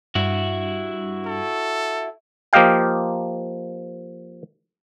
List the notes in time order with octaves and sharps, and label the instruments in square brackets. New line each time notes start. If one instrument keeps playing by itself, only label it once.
[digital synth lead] G2 [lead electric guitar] E4 F#4
[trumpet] A4
[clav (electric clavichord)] F3 A#3 G4 D#5 F5 G5